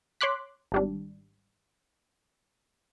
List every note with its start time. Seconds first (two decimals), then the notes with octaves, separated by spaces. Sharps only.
0.21 C#5 C6 D6 F#6 B6
0.72 G#1 G3 D4